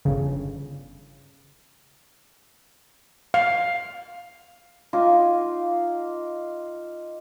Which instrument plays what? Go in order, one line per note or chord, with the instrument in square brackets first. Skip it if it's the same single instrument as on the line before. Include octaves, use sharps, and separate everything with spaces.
[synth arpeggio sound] G1 C#3
[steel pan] F5
[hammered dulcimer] D#4 F4 G#5 D6